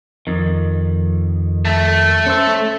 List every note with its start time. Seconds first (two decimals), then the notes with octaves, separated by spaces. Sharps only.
0.27 F2 D#3
1.65 A3
2.26 C#4 C5 E5